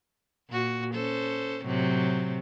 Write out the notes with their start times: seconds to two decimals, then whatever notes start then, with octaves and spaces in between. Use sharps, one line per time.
0.49 A#2 F#4
0.94 C#4 A4 C5
1.65 A2 C3 F#3